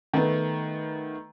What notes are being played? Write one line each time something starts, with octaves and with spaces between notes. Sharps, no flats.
D#3 A3 B3